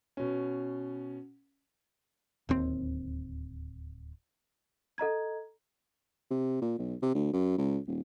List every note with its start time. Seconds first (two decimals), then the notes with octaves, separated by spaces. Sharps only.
0.17 B2 C#4
2.49 D1 D#2 C4
4.98 A4 D#5 A#5 G#6
6.30 C3
6.61 A#2
6.78 B1
7.02 C3
7.14 D2
7.33 F#2
7.58 C#2
7.87 D#1